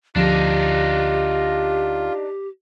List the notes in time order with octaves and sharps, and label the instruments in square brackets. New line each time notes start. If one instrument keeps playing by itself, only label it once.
[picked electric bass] D2 F3 [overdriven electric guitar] D4 D#4 [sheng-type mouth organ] F4 [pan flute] G4